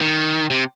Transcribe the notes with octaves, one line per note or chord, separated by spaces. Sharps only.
D#3
C3